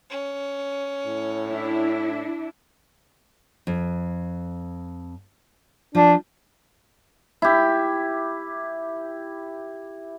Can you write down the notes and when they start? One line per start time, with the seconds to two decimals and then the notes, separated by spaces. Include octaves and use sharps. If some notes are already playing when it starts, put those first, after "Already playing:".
0.10 C#4
1.06 A2
1.50 D4 E4
3.67 F2
5.95 F3 D4
7.42 E4 G4